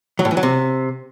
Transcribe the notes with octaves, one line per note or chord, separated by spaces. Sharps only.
F#3
A2
E3
F#3
C3